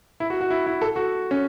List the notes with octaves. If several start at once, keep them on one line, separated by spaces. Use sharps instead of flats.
E4
F#4
F#4
E4
E4
A4
F#4
C#4